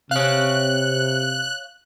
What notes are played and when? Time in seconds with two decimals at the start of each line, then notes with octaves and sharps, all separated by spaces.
0.11 C3 C#5 F5 F#6